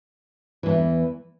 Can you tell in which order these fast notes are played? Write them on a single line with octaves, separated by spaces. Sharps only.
E3 G#2 E2